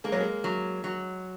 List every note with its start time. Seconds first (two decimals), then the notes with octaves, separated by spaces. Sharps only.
0.04 G#3 A#3
0.12 F#3
0.20 G#3
0.44 F#3
0.84 F#3